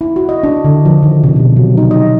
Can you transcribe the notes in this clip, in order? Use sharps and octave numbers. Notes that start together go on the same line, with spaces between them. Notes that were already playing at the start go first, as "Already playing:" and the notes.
E4
F#4
D#5
D4
D3
F3
D#3
C3
B2
F#3
D#4
D#5